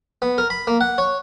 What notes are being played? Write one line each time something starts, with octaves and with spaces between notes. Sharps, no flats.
B3
A#4
B5
A#3
F#5
C#5